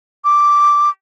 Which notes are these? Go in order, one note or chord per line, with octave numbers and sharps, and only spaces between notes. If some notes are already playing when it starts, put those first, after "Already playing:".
D6